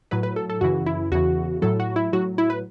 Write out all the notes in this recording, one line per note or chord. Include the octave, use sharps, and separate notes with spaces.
A2 F#3 B4
B4
A4
A4
F#2 C#3 E3 F#4
E4
E2 C#3 E3 F#4
A2 F#3 A4
F#4
E4
A2 F#3 F#4
E4
B4